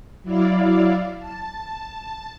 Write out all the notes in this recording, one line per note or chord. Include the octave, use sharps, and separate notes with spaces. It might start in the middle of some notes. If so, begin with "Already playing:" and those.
F#3 E4 D5 F5
A5